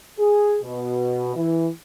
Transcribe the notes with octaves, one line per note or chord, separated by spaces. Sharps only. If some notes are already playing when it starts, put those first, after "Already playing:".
G#4
B2
E3